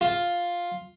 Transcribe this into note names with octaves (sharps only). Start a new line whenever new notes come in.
F4